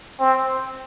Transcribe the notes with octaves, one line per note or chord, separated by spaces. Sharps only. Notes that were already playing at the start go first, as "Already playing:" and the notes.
C4